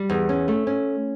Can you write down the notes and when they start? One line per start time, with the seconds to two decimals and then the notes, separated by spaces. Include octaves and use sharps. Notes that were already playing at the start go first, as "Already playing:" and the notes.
Already playing: G3
0.10 E2
0.29 C#4
0.48 A3
0.67 C#4